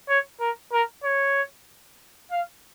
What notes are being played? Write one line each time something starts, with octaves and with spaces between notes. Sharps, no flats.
C#5
A#4
A#4
C#5
F5